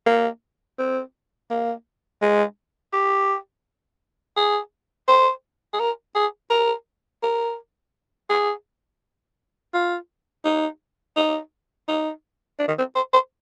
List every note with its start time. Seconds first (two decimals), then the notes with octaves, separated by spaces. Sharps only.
0.06 A#3
0.79 C4
1.51 A#3
2.22 G#3
2.93 G4
4.37 G#4
5.08 C5
5.73 G#4
5.80 A#4
6.15 G#4
6.51 A#4
7.23 A#4
8.30 G#4
9.74 F4
10.45 D#4
11.17 D#4
11.88 D#4
12.59 D4
12.68 D#3
12.78 C4
12.96 C5
13.13 C5